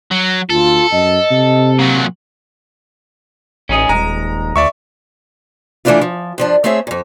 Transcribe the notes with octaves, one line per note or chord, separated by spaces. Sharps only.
F#3
D2 F4 A4
F#2 D#5
C3
A#2 F#3
A1 C#4 D#4 G#4
D#1 G#3 A#5
D2 D5 E5 C#6
E3 A3 C4 D4 E4 F4
F3
G2 F3 D4
A3 C4 G#4 C#5 E5
F2 A#2